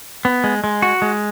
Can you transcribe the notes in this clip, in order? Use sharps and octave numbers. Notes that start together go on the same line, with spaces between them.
B3
G#3
G#3
F#4
G#3